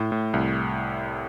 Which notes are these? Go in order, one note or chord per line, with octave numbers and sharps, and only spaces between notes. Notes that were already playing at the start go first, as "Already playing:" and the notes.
Already playing: A2
A2
C2